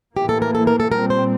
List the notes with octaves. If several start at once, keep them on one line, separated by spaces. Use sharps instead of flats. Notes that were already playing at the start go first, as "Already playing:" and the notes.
A2 E3 A#3 G4
A4
A#4
A4
A#4
A4
A#2 G3 C4 A#4
C5